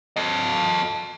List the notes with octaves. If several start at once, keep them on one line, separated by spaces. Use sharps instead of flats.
A4 D#5